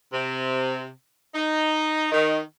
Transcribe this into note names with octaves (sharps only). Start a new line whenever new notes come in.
C3
D#4
D#3